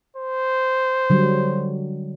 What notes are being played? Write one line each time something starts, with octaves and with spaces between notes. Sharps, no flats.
C5
D3 F#3 G3